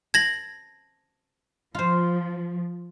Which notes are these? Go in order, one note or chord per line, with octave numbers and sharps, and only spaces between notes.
A5 G#6 A#6 F#7
F3 F4 C5